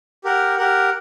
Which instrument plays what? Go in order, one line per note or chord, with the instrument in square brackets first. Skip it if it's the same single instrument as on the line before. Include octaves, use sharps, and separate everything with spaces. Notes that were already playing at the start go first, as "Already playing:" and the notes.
[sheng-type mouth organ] G4 A#4 F#5
G4 A#4 F#5